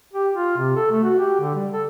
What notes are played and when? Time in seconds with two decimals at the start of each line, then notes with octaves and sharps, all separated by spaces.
0.13 G4
0.33 F4
0.58 C3
0.76 A4
0.91 A3
1.03 F#4
1.18 G4
1.40 D3
1.54 G3
1.73 A4